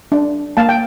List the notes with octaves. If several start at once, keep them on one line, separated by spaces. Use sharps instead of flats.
D4
A#3 F5 A5
G5